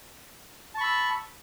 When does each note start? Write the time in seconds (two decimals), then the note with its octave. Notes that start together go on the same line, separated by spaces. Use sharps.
0.75 A5
0.78 C#6
0.81 B5
0.84 E6